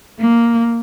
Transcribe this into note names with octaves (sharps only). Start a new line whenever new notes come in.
A#3